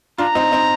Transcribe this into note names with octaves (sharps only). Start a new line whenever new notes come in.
D4 F4 A#5
C4 D#4
C4 D#4